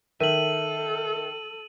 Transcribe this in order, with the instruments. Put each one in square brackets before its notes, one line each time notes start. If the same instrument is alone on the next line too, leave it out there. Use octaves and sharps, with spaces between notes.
[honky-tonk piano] D#3 [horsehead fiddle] A4 [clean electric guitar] E5 [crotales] D#7 F#7